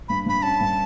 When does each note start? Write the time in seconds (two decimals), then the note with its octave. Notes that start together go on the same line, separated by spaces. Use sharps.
0.08 G2 B5
0.26 G2 B5
0.43 C#4 A5
0.60 G2